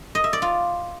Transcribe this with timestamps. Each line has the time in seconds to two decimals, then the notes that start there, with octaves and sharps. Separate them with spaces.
0.15 D#5
0.24 E5
0.33 D5
0.42 F4